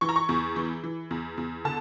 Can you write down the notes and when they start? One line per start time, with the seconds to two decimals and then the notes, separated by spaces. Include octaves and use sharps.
0.01 E3 C#6
0.09 A#5
0.16 C#6
0.29 E2
0.56 E3
0.84 E3
1.11 E2
1.38 E2
1.65 D3 A5